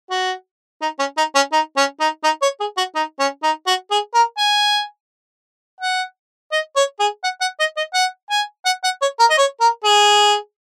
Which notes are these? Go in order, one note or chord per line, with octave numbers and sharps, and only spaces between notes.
F#4
D#4
C#4
D#4
C#4
D#4
C#4
D#4
D#4
C#5
G#4
F#4
D#4
C#4
D#4
F#4
G#4
A#4
G#5
F#5
D#5
C#5
G#4
F#5
F#5
D#5
D#5
F#5
G#5
F#5
F#5
C#5
A#4
D#5
C#5
A#4
G#4